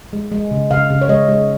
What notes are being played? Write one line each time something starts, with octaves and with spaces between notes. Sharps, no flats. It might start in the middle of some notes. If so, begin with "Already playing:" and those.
G#3
G#3
C#3
C#3 F5
C#3
C#5
G#3 D#5
G#3